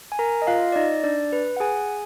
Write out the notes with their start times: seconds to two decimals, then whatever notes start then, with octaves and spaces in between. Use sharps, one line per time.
0.12 G#5
0.19 A#4 A#5
0.42 D#5
0.47 F4 F5
0.72 D5
0.76 D#4 D#5
1.04 D4 D5
1.33 B4
1.57 F#5
1.60 G#4 G#5